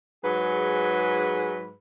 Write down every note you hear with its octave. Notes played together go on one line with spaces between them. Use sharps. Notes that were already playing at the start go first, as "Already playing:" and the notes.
G#2 F#3 G#4 B4